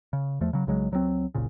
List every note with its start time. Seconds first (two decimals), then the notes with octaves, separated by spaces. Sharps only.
0.13 C#3
0.41 E2 F3 A3
0.53 C#3 F#3
0.67 B1 C#3 F#3 G#3
0.91 C#2 F#3 G3 C4
1.35 F#1 C2 A#2 C#3